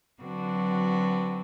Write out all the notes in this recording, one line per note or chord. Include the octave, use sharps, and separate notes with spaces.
D3 F#3 C4 F#4 B4